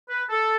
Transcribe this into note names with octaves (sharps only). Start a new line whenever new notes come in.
B4
A4